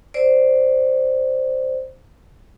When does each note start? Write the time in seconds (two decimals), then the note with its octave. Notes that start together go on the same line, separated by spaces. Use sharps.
0.14 C5 D5